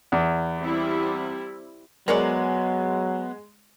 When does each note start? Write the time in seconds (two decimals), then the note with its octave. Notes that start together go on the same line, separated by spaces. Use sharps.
0.12 E2
0.59 G3 C4 E4
2.08 F#3 G#3 B3 A#4 C#5 D5